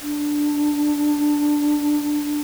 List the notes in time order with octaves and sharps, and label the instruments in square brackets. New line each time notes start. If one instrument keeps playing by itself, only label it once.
[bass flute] D4